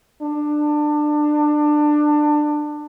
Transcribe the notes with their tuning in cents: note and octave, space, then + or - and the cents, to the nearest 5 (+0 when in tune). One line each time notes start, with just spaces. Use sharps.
D4 +20